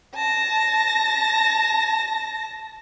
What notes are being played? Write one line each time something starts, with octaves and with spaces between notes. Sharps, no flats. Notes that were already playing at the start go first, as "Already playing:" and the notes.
A5 A#6